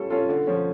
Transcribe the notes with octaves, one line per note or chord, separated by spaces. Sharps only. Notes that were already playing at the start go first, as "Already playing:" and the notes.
Already playing: G3 C#4 F4 A4
C#4 F4 A4
D3
F3 C#4